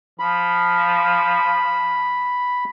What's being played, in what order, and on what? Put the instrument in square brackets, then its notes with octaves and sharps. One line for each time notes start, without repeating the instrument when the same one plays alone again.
[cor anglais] F3 [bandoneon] B5